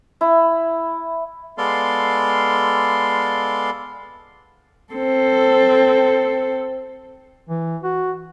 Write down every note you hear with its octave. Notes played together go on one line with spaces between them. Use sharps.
E4
G#3 B3 A4 D5 F5 C6
C4 A4
E3
F#4